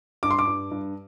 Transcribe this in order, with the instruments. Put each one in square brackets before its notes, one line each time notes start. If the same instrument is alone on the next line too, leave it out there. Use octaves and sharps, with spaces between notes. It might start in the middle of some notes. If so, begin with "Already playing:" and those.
[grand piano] G2 D6
C6
D6
G2
G2